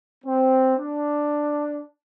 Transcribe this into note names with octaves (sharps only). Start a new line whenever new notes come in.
C4
D4